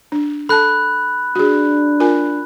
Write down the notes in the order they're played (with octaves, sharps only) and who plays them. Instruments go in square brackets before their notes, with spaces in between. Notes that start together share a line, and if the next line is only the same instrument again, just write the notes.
[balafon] D4
[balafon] A4 A5 [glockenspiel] B5 F#6
[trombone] D4 [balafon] F#4 G#4
[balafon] F4 A#4 G#5